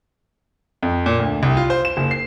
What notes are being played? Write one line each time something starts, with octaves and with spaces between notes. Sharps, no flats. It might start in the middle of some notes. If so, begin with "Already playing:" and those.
F2
A#2
D2
C2
F4
C5
E7
F#1
C7